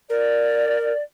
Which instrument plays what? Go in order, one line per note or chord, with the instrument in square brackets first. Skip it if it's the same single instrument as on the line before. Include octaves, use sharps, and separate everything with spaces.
[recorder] A#4 [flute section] D5